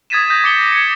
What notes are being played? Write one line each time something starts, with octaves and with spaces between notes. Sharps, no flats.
D#6 G#6 A6 B6 D#7 E7
D#6 G6 A#6
D6 C#7 G7
G#6 C#7